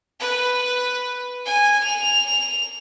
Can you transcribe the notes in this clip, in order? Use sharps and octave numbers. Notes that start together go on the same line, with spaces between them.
B4
G#5
F7